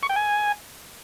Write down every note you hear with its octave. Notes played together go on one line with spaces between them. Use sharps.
C#6
G5
G#5